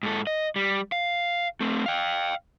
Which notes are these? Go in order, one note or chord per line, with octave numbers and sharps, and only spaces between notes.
G#2 A4
D#5
G3
F5
A3 C4
F5 G5